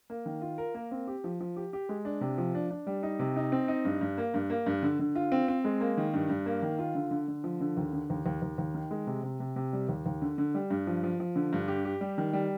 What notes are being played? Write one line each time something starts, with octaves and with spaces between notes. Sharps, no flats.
A#3
D#3
F4
A#4
A#3
C4
G4
F3
F3
G4
G4
G#3
D4
C3
F3
D4
D4
G3
D#4
C3
D#4
C4
D#4
G2
G2
A#3
G2
A#3
G2
D3
D3
F4
C4
C4
G#3
A#3
D#3
G2
G2
A#3
D#3
F4
D3
D3
D3
F3
D3
D#2
D3
D#2
D#2
D#2
D#2
D#3
G#3
C3
C3
C3
C3
G3
D#2
D#2
D3
D3
G3
G2
F3
F3
F3
D3
G2
G4
G4
G3
D#3
G3